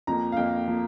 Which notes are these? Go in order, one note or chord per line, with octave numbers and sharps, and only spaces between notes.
F2 F3 A#3 A#5
F5
F2 F3 A#3 G5
F3 A#3